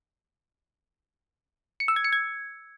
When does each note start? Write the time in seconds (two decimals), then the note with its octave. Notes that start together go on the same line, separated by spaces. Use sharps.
1.80 C#7
1.88 E6
1.96 G#6
2.04 C#7
2.13 G#6